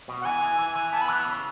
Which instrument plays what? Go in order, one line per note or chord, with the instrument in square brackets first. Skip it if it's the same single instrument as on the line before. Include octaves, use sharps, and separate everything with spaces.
[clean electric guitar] B2
[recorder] F#5
[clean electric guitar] E3 [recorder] G#5
[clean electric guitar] E3
E3
E3
[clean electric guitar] B3 [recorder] A5
[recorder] B5
[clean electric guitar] E3 [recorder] F#6
[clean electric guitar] C#3